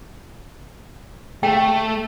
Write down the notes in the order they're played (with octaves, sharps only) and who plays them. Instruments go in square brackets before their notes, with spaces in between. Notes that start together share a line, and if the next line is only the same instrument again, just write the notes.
[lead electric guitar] A3 [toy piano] G5